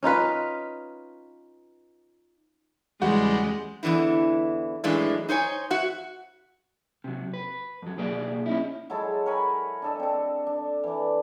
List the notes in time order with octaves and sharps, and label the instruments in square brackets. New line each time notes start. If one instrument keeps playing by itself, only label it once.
[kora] C#4 D#4 F4 B4
[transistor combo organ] E2 G3 [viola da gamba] C#3 G#3 [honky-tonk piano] F#4
[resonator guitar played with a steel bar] E2 A2 D3 E3 E4
F#2 A2 E3 G#3 D4
D#4 C5 C#5 G#5
F#4 E5 F#5
[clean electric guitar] C3 F#3
B4
F2 F#3
B1 A#3 G#4 B4 D5
C#4 D#4 E4
[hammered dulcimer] F#3 G#3 E4 A4
A#4 C#5 G#5 B5
D4 A4 D#5
C4 A4
D4
E3 D5